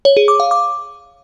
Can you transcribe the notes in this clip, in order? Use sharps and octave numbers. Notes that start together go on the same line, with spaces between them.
C#5
G#4
D6
F5
D6